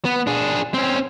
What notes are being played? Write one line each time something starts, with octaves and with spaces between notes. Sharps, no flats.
B3
D4 G#4
C4 C#4